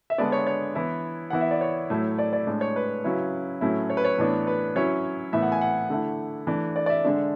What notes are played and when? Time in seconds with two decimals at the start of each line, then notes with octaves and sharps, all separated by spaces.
0.10 E5
0.18 D3 G#3 B3 D4 D5
0.32 C#5
0.47 C#5
0.75 E3 B3 E4
1.30 E3 B3 E4 F#5
1.41 E5
1.51 D5
1.61 C#5
1.90 A2 F#3 A3 E4
2.19 D5
2.33 D5
2.47 A2 G#3 D4
2.61 C#5
2.76 B4
3.04 C#3 F#3 C#4 E4
3.61 A2 F#3 A3 C#4 E4
3.90 C#5
3.97 B4
4.04 C#5
4.18 A2 E3 B3 D4
4.47 B4
4.76 F#3 C#4 E4 C#5
5.33 A2 E3 B3 E5
5.42 F#5
5.52 G#5
5.61 F#5
5.90 D3 A3 E4
6.47 E3 A3 D4
6.76 D5
6.86 D5
6.90 E5
7.05 D3 G#3 D4